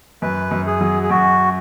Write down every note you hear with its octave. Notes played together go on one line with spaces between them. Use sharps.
F#2 B4
F#2
G#4
F#3
G#4
F#2 F#4